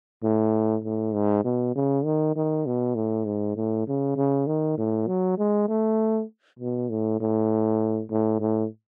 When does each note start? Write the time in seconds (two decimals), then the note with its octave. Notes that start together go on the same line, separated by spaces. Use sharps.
0.24 A2
0.84 A2
1.14 G#2
1.45 B2
1.75 C#3
2.05 D#3
2.36 D#3
2.66 B2
2.95 A2
3.26 G#2
3.57 A2
3.87 C#3
4.17 C#3
4.47 D#3
4.78 A2
5.07 F#3
5.38 G#3
5.68 A3
6.59 B2
6.90 A2
7.20 A2
8.11 A2
8.40 A2